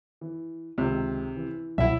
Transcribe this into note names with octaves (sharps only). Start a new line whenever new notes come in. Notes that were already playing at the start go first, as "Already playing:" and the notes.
E3
C#2 C3 D#3
E3
C2 B2 F#3 E4 E5